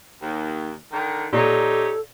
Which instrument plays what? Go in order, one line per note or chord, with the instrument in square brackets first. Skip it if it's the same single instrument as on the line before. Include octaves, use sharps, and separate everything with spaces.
[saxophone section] D#2
D3 D#3
[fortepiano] A#2 [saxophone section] D#4 C#5 [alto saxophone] G4 [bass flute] A4